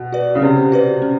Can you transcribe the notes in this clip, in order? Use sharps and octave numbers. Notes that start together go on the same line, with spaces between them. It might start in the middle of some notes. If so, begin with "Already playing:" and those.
Already playing: B2
F#4 B4 D5
C#3
C3 C#4
F#4 B4 D5
C#4